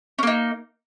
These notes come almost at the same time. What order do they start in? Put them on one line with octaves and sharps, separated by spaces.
C#4 A#3 D#4